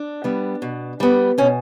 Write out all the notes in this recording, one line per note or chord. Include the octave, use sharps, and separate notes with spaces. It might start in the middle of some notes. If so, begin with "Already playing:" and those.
Already playing: D4
G3 B3
B2
G3 B3
B2 C#4